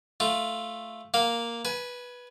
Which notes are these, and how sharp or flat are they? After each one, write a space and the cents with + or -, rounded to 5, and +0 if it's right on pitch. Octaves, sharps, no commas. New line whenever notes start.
A3 +0 F4 -5
A#3 +0 F5 +0
B4 -10 G#5 +20